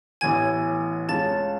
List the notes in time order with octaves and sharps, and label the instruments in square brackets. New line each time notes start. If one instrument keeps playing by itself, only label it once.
[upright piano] A1 A2 E3 B3 [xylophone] G#5 G#6
[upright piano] C#2 C#3 G#3 C#4 [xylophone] A5 A6